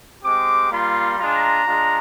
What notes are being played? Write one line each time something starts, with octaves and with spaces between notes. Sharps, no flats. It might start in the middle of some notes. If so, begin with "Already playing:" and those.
G#3 C4 G4 D6
G3 A#3 F4 C6
G#3 D4 F4 A#5
G#3 D4 F4